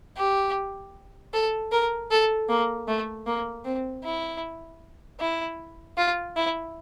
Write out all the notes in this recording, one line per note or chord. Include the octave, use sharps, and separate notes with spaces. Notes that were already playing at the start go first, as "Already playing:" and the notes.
G4
A4
A#4
A4
A#3
A3
A#3
C4
E4
E4
F4
E4